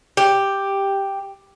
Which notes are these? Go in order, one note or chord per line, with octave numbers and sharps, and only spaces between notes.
G4